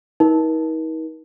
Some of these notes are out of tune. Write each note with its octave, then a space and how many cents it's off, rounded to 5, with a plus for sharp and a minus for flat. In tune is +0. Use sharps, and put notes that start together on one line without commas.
D#4 +45 A#4 +45